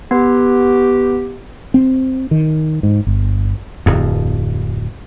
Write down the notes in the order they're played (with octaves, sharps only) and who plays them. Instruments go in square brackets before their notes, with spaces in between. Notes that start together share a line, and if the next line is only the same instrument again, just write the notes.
[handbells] B3 B4 [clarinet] G4
[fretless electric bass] C4
D#3
G#2
G1
[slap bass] D1 F2